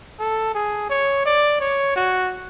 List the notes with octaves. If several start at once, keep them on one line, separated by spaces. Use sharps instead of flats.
A4
G#4
C#5
D5
C#5
F#4